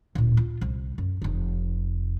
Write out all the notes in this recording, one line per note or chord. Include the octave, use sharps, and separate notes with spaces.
D1 A#2
F4
C2
F#2
F1 D#4